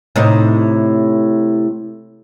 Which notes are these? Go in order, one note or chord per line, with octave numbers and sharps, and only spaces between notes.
A2 C3 D#4